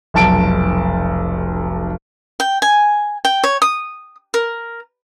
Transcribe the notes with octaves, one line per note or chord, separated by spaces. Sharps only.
F1 B1 A5 D7
G5
G#5
G5
C#5
D#6
A#4